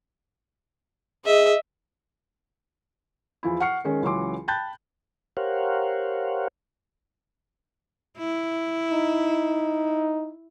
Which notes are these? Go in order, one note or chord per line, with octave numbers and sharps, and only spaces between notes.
G#4 D#5 E5
E2 F3 E4
F#5 C#6 F6 C7 C#7
D#3 G#3 C#4
C#2 E3 F#3 C6 D6
G5 A5 B5 F#6 G6 A6
G4 A#4 C5 C#5 F5 F#5
E4
D#4